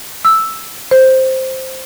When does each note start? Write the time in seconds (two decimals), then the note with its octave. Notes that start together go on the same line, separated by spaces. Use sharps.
0.25 E6
0.91 C5